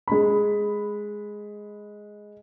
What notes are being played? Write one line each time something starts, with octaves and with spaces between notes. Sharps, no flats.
G#3 B5